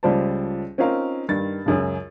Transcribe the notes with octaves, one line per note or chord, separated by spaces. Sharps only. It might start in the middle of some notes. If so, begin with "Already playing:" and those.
C#2 F3 G3 C5 D5 A5
C4 C#4 D#4 F4 A#4 F5
G2 D#3 A6
C#2 F#2 G#4